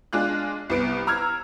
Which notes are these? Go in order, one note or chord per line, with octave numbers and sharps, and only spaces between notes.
G#3 D4 F4 F#6
C2 B3 D7
A#5 E6 F6 G#6